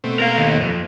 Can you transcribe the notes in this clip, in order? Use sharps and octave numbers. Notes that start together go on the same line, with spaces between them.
B2 A3 C4
A#4 F5
D#2
F2